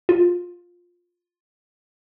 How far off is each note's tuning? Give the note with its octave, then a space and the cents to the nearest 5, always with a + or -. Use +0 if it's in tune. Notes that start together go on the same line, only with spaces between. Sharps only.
F4 +10